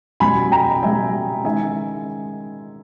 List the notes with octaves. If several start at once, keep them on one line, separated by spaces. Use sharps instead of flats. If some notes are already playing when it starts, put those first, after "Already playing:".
B2 G3 C#4 G#5 B5
G5 A#5
B2 G3 C#4 E5 G#5
D#3 G#3 C#4 E5 G#5